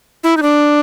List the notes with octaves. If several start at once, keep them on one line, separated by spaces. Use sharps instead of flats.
E4
D#4
D4